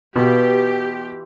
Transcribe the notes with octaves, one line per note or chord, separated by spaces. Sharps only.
B2 E3 F4 G4 C5